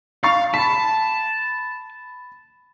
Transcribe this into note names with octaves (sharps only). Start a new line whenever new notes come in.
F5 C#6 A6 C7
A5 B5 B6